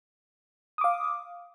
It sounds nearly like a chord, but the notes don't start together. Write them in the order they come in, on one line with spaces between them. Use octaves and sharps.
D#6 D6 F5